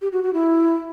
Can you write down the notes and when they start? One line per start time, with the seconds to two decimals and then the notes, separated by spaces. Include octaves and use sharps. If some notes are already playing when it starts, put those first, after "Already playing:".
0.02 G4
0.12 F#4
0.23 F#4
0.33 E4